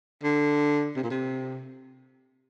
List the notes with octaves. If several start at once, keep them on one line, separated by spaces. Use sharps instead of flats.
D3
C3
A#2
C3